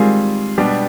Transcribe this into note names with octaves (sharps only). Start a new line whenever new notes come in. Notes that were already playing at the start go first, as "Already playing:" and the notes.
Already playing: D#3 G3 G#3 C4 F4 G#4
B2 G3 B3 D4 G4